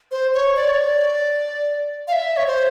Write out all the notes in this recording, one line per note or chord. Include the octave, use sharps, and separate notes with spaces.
C5
C#5
D5
C#5
D5
F5
E5
C#5
C5